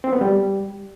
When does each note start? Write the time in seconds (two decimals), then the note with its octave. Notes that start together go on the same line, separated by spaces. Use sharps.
0.04 C4
0.13 B3
0.21 G3